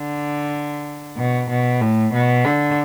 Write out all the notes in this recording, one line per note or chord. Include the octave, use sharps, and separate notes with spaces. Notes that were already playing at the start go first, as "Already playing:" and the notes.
Already playing: D3
B2
B2
A2
B2
D3